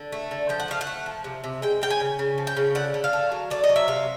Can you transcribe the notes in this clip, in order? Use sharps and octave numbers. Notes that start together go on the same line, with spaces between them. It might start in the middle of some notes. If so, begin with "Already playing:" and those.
Already playing: D3
A3
D3
F3 G5
F#5
A3 F5
F#5
A3
F3
C3
C3
G#3 G5
C#3 G5
G#5
C#3
C#3
F3
G5
C#3
D3 F#5
D3
F5
A3
F#3
A3 D5
D#5
F#3
E5
C3 F5